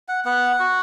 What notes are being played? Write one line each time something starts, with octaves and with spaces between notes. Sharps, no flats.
F#5
B3 F#5
F#4